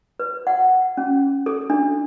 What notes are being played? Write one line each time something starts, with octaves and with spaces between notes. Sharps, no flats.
B4
F#5
C#4
A4
D4